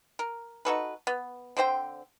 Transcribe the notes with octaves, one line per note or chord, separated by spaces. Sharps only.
A#4
D#4 F#4 A4 B4
B3
D3 C4 C5 G5